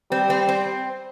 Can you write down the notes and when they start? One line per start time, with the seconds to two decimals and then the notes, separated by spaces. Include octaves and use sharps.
0.11 G3 C4
0.30 C4
0.49 C4